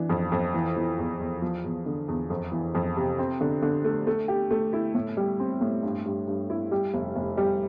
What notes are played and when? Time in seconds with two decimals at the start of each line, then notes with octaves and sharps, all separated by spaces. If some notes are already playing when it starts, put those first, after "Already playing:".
Already playing: E3 D4
0.09 F2
0.32 F2
0.54 E3
0.76 E3
0.98 E2
1.20 E2
1.42 F3
1.64 E2
1.86 D3
2.08 E2
2.30 F2
2.52 E3
2.75 F2
2.97 C3
3.19 C4
3.41 D3
3.62 D3
3.84 A3
4.07 A3
4.28 G4
4.51 A3
4.73 E4
4.95 A2
5.17 G3
5.39 C4
5.61 A2
5.83 G2
6.05 G2
6.27 G2
6.50 E4
6.71 G3
6.94 F1
7.16 F1
7.37 G3